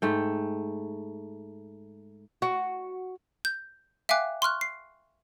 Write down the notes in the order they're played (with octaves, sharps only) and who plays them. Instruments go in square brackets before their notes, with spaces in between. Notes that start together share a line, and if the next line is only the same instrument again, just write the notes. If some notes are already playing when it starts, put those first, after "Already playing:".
[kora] G#2 A3 G5
[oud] F#4
[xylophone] G6
E5 F5 G5 G#5 D6 F#6
C6 C#6 F6 F#6
C7